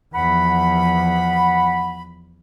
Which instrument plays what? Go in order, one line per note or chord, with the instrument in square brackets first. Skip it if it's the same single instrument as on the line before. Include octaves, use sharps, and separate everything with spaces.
[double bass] E2 F3 [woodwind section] F#5 B5